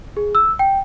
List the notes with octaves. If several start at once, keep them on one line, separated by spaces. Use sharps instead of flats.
G#4
E6
G5